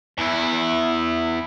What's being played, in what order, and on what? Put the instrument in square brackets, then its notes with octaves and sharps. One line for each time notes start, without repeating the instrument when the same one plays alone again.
[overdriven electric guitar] E2 E4